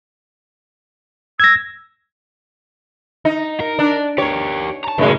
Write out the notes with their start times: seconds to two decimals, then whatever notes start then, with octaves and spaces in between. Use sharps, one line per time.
1.40 E6 G#6 A#6
3.25 D#4
3.60 A#4
3.79 D4
4.18 G4 A#4 C#5
4.84 A5 A#5
4.98 F#2 A2 C#3 G#3